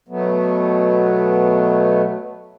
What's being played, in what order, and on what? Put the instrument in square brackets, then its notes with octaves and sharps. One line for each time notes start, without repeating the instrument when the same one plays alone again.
[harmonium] B2 F#3 A3 B3